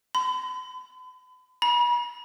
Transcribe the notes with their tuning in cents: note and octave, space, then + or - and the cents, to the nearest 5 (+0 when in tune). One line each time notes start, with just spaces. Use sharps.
B5 +40
B5 -40